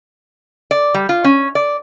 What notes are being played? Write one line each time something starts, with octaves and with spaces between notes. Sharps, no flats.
D5
G3
F4
C#4
D5